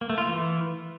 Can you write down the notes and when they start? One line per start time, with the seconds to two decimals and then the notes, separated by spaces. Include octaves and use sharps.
0.01 A#3
0.10 A3
0.18 F4
0.26 E3